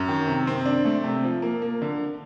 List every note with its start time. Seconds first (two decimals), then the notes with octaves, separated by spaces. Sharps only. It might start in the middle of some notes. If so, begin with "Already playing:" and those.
Already playing: F#2
0.09 D#3
0.28 C3
0.47 C4
0.66 D4
0.85 A3
1.04 C3
1.24 F3
1.42 A#3
1.62 A#3
1.82 D3